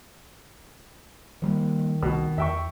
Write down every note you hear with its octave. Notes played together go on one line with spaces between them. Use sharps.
D#3 F3 G3 A#3
C2 B2
E2 E5 G5 C#6